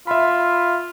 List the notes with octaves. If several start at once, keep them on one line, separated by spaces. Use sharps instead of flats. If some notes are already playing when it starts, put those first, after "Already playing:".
F4 E5 B5